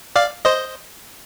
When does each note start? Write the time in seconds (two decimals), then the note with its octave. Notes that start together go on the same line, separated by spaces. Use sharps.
0.16 D5 F5
0.45 C5 D#5